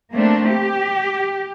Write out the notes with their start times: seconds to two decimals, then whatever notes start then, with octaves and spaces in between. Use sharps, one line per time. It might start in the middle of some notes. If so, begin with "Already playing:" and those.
0.13 A3 A#3 C4 D4
0.50 G4